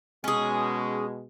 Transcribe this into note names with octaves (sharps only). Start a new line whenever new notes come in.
B2 G#3 C#4 G#4